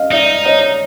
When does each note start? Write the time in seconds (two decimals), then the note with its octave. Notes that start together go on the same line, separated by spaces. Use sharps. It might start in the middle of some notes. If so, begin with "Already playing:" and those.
Already playing: D#5 F5
0.11 D#4 D5 E5
0.45 C#5 D#5